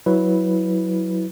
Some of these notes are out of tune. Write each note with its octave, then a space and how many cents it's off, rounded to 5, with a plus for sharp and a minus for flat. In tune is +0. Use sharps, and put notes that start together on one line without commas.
F#3 +0 E4 -10 B4 +5